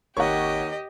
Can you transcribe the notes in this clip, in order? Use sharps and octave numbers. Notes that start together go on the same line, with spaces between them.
G#1 D#2 G4 A#4 C#5 D#5 F#5 C#6